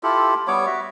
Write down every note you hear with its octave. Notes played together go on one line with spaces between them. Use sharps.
E4 F4 G4 A4
G3 B3 C#5 D6
F#4 E5